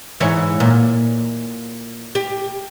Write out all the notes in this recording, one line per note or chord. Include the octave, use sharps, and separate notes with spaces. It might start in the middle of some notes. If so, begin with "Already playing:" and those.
G#2 E3 C#5
A#2
G4